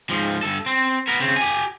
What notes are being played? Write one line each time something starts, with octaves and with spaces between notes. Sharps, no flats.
G#2 F3
G2 A4
C4
B3 A#4
C#3 C4
G4 G#5